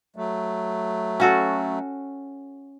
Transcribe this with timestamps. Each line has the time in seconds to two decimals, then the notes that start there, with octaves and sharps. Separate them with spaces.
0.16 F#3 A3
1.20 C#4 F#4 A4